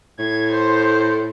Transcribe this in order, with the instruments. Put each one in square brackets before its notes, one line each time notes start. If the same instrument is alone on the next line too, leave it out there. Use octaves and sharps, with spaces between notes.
[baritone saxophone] A2 [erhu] G#6
[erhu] C5